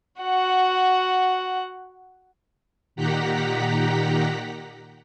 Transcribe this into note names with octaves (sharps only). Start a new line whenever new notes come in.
F#4 F#5
A#2 D#3 G4 F#5 A#5 B6